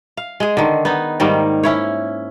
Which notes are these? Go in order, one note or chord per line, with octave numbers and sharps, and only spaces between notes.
F5
G#3 G#4
D3 D#3
B3 D#4
G#2 D#3 G3 A#3
C#4 E4 C#5